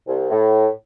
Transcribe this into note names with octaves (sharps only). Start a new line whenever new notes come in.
C2
A2